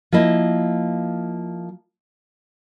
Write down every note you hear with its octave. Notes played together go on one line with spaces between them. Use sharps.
F3 A#3 E4 D#5